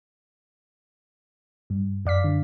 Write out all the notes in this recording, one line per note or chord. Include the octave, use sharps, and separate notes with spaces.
G2
F#2 D5 F5 B6
D3